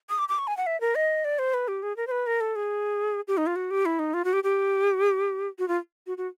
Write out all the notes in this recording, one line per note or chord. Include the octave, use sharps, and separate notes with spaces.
D#6
D6
D6
C#6
G#5
F#5
E5
A#4
D#5
D5
C5
B4
G4
G#4
A#4
C5
B4
A#4
A4
G#4
G4
D#4
F4
F#4
G4
E4
D#4
F4
F#4
G4
G4
F#4
F4
F#4
F#4